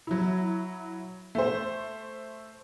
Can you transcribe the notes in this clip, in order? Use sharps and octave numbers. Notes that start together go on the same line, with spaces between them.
F#3 E4
A3 C5